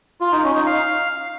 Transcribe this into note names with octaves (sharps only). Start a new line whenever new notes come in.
F4
D#4
C#4
D#4
F5